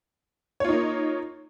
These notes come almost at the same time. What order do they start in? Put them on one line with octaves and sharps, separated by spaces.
C#5 F4 D#4 A#3